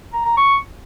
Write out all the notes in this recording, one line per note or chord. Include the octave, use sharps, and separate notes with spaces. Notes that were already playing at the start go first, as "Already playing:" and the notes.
A#5
A#5
C#6